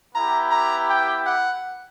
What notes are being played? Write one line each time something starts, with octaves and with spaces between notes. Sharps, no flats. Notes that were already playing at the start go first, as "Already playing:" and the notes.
B3 E4 G4 A#5
A#5
G5
F#5